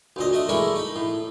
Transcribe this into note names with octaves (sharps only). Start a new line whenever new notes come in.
D2 A#2 D#5
A3 D4 D#5
G#3 A3 E4 A#4 C#5 D5
D#4 B5
A2